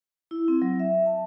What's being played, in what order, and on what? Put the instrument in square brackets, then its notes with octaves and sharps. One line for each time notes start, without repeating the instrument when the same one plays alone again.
[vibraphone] E4
C4
F#3
E5
A5